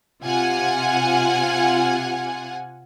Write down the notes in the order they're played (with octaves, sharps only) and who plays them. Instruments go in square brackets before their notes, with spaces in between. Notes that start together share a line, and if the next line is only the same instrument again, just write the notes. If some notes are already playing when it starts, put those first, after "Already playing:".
[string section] C3 F4 F#5 G#5